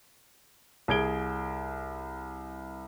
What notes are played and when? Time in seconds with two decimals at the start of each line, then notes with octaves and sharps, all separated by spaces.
0.88 C2 G#4 G#6 D7 G7